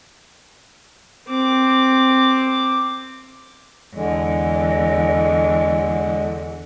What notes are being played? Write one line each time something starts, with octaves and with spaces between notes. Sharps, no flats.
C4 D6
E2 D3 G#3